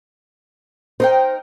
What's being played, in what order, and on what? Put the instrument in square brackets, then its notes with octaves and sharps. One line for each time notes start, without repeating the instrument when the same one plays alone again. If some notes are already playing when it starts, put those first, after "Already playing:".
[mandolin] D#4 A#4 G5 [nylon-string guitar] C5